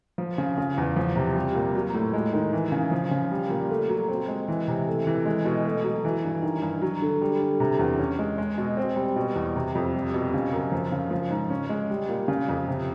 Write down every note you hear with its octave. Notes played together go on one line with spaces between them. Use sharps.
F3
C#3
C#3
E2
F3
C3
G3
A#2
F#3
A2
G#3
D#3
E3
C#3
F3
C#3
G3
A#2
A3
F#3
C4
G#3
E3
C3
A3
E3
G#3
B2
A3
F#3
E3
G2
D#3
G2
F#3
D3
G3
D3
C3
E2
C#4
G#3
G#3
B2
C4
G3
B2
E2
C3
F2
G3
B2
C#3
F#2
F3
C#3
F3
G#2
C#4
G#3
G3
A#2
C#3
F2
C3